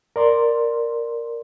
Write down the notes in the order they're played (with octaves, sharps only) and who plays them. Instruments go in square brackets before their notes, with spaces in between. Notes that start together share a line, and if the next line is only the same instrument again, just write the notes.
[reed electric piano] A#4 D5 C6